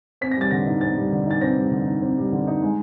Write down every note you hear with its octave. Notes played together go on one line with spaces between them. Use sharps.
C4 B6
A#6
G3 A6
D3 A#6
D#4
C4 A6
G3
D3
D#4 A6
C4 A#6
G3
D3
D#4
C4
G3
D3
D#4
G#3